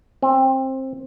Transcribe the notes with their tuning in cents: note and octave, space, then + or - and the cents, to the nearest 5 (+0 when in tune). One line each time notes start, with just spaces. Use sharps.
C4 +20